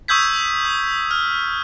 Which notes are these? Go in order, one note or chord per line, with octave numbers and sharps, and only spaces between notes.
C#6 D#6 E6 G6 G#6 B6
D#6
F6